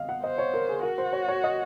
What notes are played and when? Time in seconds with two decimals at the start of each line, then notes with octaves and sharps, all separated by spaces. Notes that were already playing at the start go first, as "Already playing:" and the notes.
Already playing: D#5 F5
0.09 F#5
0.23 C5 D#5
0.38 C#5
0.54 A#4
0.69 G#4
0.83 F#4 A#4
0.98 C5
1.13 C#5
1.28 C#5
1.44 D#5